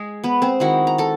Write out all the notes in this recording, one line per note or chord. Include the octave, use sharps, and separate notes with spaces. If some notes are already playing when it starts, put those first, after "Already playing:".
Already playing: G#3 G#4
B3 B4
C4 C5
D#3 G#3 C4 E4 F#4 F#5
A#5
A4 A5